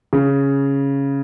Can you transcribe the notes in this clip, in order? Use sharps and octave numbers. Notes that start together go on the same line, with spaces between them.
C#3